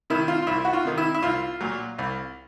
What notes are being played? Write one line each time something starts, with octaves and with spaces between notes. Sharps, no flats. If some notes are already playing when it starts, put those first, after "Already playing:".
C3 D#3 E4
F4
F4
C2 E4
F#4
F4
C3 D#3
E4
E4
C2 F4
A#2 F#3
C2